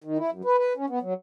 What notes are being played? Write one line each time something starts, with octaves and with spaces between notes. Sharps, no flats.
D#3
E4
F#2
B4
B4
C#4
B3
F#3